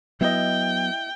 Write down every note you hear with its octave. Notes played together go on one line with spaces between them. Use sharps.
F#3 B3 E4 D#5 G5